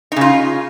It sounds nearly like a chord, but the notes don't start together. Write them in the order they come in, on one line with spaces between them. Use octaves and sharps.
D#4 C#3 F4